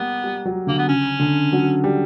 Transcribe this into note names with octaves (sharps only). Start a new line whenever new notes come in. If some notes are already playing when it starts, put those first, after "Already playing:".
Already playing: G3 A#3 B3
G3
F#3
D3 A#3
B3
C#3 C#4
D3
F#3
G3